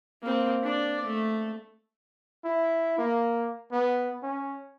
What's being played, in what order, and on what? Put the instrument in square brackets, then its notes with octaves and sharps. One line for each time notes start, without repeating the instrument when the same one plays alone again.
[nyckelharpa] A#3 C4
D4 D5
A3
[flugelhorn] E4
A#3
B3
C#4